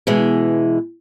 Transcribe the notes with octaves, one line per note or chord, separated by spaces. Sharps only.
B2 E3 G#3